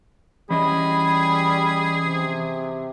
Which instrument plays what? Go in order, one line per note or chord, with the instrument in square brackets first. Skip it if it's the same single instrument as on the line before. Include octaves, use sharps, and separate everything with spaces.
[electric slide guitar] E3 C#4 D#5 [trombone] G3 [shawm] G#4 [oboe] B5
[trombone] C3